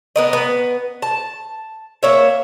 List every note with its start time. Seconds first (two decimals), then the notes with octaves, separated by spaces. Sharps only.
0.16 B3 A#4 D#5
0.33 B3
1.02 A5
2.03 A#3 C#5 E5